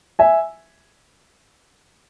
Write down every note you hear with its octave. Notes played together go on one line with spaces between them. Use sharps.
E5 G#5